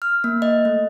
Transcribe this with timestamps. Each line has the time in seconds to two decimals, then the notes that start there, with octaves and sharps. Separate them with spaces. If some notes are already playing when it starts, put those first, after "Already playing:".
0.02 F6
0.24 A#3
0.42 D#5
0.65 A3